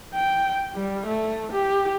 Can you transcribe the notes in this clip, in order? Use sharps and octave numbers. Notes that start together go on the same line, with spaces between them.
G5
G3
A3
G4